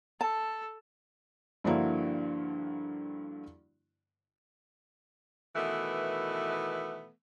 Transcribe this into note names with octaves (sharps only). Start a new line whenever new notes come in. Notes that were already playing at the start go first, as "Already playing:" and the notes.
A4 A5
G2 D3 F3 A#3 E4 F#4
B2 D#3 E3 A3 B3